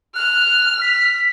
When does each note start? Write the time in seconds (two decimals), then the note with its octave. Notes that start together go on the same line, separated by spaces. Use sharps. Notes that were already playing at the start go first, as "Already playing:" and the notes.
0.15 F6 F#6
0.81 B6